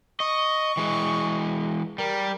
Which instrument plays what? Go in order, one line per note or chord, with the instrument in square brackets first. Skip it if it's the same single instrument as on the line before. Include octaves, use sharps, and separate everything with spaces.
[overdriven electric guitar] D#5 [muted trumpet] C#6
[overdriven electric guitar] E3 G#3
[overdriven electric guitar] G3 [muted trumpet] A#4